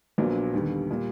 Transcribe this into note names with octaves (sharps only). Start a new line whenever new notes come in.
A#1 A#2 F#3 B3 D4
D#2 D3 G3 B3
A#2 G3